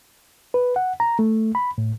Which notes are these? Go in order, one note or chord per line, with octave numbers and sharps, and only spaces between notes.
B4
F#5
A#5
A3
B5
A2